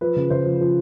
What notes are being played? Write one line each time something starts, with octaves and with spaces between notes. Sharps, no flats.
F3 B4
C#3
C#3 C5
F3
F3